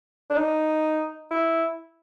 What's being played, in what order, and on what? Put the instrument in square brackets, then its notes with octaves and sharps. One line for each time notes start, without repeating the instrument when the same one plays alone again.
[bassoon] D4
D#4
E4